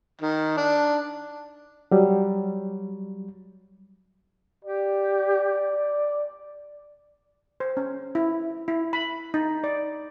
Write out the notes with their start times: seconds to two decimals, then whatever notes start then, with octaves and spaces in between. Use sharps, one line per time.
0.21 D#3
0.57 D4
1.91 F#3 G3
4.65 G4 D5
7.60 C5
7.77 C#4
8.15 E4
8.68 E4
8.93 B5
9.34 D#4
9.64 D5